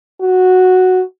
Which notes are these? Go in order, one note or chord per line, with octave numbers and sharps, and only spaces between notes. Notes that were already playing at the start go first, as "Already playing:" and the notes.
F#4